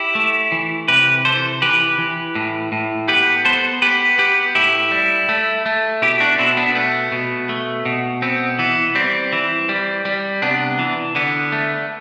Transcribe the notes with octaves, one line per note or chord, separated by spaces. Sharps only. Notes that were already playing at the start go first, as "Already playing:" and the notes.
Already playing: E4 G4
A3
E3
C3 G4 B4
E3 A4 C5
E3 G4 B4
E3
A2
A2
B3 G4 B4
B3 A4 C5
B3 G4 B4
B3 G4 B4
A2 E4 G4
G3
A3
A3
B2 E4 G4
D4 F#4
B2 C4 E4
B3 D4
A3 B3
B2
A3
B2
B3 C4
E3 B3
G3 C4
E3
G3
G3
C3 B3 D4
E3
D3 B3
A3